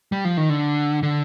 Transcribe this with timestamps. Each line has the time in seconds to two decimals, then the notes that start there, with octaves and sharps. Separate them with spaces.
0.12 G3
0.25 F3
0.37 D#3
0.49 D3
1.03 D3